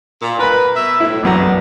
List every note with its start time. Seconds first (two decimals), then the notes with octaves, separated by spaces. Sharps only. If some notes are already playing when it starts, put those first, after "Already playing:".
0.21 A#2
0.39 A#4 B4 B5
0.75 B2 E5
1.00 A2 E4
1.23 B1 F#2 G3 B3 D5 A#5